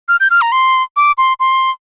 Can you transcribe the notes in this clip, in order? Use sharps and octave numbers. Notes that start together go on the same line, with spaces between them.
F6
G6
F6
A#5
C6
D6
C6
C6